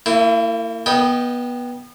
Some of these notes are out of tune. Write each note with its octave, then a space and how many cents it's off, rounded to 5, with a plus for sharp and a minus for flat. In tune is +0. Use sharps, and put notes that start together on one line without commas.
A#3 -40 E4 +15
B3 -20 D#5 +0 G5 +0